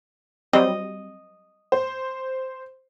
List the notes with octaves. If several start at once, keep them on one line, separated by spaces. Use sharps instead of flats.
F#3 G3 C4 D#5
C5